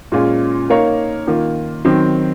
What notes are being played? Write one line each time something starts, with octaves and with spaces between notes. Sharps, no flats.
A#2 G#3 C#4 F4
A#3 D#4 A#4 C#5 F5
D#3 A#3 F4
D#3 F#3 C4